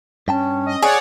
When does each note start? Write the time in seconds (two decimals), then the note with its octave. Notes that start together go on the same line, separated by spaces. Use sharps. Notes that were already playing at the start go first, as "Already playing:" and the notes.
0.28 G2 C#4 G5 A5
0.66 D#5
0.82 G#4 C#5 D5 F#5